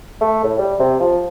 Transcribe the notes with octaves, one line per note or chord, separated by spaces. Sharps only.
A3
A2
G3
C3
F3